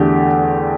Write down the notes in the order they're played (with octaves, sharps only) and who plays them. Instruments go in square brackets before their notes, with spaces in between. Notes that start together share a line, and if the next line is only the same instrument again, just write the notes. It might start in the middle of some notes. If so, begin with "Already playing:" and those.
Already playing: [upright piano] E2 D3 A3 G4